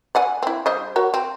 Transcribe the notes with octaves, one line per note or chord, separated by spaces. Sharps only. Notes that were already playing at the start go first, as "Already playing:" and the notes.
D5 F#5 G#5
C4 E4
G3 C5 D#5
F#4 A#4 C#5
C4